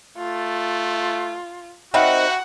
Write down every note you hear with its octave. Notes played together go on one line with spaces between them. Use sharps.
A3 F4
C4 D#4 F#4 A#4 E5 F#5 G5 B5